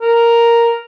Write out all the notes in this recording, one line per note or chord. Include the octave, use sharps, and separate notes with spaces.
A#4